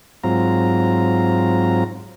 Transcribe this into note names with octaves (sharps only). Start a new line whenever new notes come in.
G#2 F#3 C4 F4 A#5